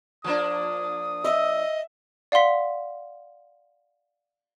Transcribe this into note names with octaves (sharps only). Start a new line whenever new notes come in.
F3 A#3 D4 D#6
D#5 E5
D5 F5 F#5 C6 B6